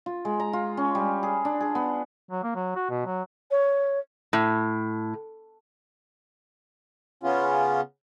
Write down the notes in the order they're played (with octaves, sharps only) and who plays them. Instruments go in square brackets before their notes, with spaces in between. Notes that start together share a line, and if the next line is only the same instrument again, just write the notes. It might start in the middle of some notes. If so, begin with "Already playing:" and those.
[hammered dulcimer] F4
G#3
A#5
F4
C#4
G3
G#4
D4
G#4
B3
[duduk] F#3
A#3
F#3
F#4
B2
F#3
[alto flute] C#5
[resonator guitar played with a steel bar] A2
[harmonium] C#3 B3 C#4 F4